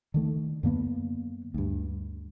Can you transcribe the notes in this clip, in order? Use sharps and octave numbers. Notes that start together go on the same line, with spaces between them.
D3 D#3 A3
F#2 D3 A#3 B3
D2 G2